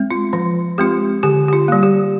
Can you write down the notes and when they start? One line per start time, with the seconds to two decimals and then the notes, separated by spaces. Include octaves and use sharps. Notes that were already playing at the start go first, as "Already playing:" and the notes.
Already playing: G#3 C4
0.11 F4
0.33 F3 F4
0.78 G#3 C4 F4 G4
1.23 D3 G4
1.48 G4
1.53 F4
1.68 G3 A#3
1.83 G4